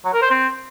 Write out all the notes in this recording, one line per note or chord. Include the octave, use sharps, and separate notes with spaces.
F#3
A#4
C5
C4